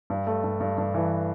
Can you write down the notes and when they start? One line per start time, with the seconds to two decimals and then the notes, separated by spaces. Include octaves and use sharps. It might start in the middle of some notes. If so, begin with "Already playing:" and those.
0.10 G2
0.27 A3
0.44 G2
0.60 G2
0.78 G2
0.94 E3